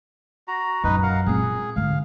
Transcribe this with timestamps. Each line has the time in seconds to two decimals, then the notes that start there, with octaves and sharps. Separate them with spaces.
0.48 F#4 A#5
0.84 F#2 A#2 D#4 B4
1.03 A#4 F5 F#5
1.26 A#2 C4 G#4
1.76 G#2 D3 F5